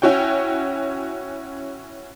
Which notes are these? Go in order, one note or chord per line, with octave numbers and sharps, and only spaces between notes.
C#4 E4 F#4 C#5 G5